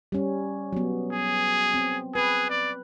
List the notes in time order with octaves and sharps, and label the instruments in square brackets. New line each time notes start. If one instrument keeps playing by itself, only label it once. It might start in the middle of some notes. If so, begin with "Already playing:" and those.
[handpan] G3 C#4
F#3 B3
[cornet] G#4
[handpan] C4
[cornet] G#4 [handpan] B4
[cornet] D5